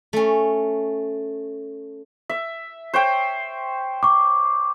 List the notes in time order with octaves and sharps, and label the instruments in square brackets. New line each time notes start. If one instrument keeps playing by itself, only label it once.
[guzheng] A3 C#4
[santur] E5
C5 C#5 G5
[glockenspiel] C#6 D6